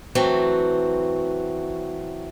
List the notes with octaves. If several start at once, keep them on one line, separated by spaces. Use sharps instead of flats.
E3 F#3 A3 C4 F#4